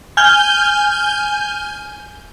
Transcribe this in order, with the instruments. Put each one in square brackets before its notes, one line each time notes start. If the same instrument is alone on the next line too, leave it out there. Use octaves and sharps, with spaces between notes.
[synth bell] G#5 F6 G6 G7